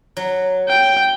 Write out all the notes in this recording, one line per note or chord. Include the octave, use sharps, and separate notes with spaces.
F#3
G5